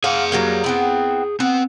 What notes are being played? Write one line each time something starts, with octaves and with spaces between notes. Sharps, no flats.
G#4 F5 F#5
F#3 G3 A#3
B3 C4 E4
B3 C4